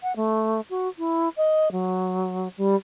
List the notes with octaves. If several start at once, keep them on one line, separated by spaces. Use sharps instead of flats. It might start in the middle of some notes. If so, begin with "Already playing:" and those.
F#5
A3
F#4
E4
D#5
F#3
G3